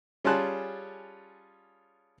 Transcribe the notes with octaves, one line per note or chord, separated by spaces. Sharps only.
G3 C#4 F4 G#4 A5 F#6